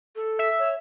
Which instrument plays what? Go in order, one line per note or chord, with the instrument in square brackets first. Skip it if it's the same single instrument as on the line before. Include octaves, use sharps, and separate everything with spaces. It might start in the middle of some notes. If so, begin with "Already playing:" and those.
[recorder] A4
[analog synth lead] E5
[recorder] C#5